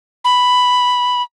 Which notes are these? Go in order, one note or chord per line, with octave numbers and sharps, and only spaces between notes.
B5